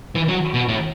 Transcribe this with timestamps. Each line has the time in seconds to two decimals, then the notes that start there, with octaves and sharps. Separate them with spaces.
0.15 E3
0.29 F#3
0.54 B2
0.69 A2